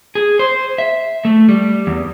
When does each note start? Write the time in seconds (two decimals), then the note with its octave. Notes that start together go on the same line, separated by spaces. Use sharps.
0.15 G#4
0.39 C5
0.78 E5
1.25 A3
1.49 G3
1.87 E2